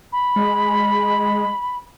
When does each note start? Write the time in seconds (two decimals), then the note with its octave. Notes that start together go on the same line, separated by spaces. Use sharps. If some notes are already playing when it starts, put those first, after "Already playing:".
0.12 B5
0.36 G#3